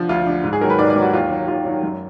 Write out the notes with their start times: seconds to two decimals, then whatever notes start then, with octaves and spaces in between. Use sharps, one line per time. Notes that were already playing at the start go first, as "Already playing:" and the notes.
Already playing: D3 F3
0.09 D2 F4
0.27 D3 F3
0.44 G#2
0.53 G#4
0.61 D#3 F#3 A#4
0.70 B4
0.79 G#2 D5
0.90 D5
0.96 D#3 F#3
1.02 F#4
1.13 D#2 F4
1.30 D#3 F#3
1.48 D#2 F4
1.65 D#3 F#3
1.83 F#2